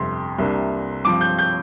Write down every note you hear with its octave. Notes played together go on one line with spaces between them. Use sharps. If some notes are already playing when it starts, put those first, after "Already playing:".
Already playing: G1 F2 C3 C6
C2 C3 A#3 D4
G2 F3 C4 D6
G6
G6